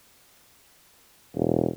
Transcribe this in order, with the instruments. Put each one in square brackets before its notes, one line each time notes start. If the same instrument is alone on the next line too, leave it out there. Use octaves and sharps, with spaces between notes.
[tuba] E1